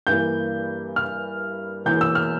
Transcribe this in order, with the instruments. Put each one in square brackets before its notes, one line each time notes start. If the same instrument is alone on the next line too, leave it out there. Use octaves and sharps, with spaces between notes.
[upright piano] G2 E3 A#3 G6
F6
E1 E2 E3 A#3 G6
E6
F6